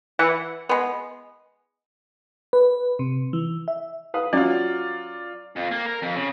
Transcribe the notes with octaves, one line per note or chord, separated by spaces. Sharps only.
E3 F#5
G#3 B3
B4
C3
E3
E5
B4 F5 D#6
F#3 C#4 F4 D5
F2
A#3
A#4
F2
C#3